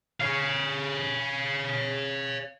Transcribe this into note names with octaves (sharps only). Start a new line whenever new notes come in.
C#5 F5